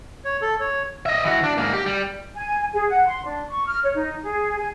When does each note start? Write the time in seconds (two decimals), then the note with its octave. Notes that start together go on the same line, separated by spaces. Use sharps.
0.25 C#5
0.42 A4
0.60 C#5
1.06 D#5 E5
1.24 E3 F#4
1.44 D4
1.58 G#2 A#3
1.73 G4
1.86 G3
2.35 G#5
2.73 G#4
2.90 F#5
3.07 C6
3.25 D4
3.48 C#6
3.67 F6
3.83 C#5
3.95 D#4
4.23 G#4
4.58 G#5